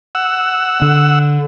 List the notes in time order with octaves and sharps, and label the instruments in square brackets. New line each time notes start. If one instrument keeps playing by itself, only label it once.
[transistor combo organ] F#5 E6
[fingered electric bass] D3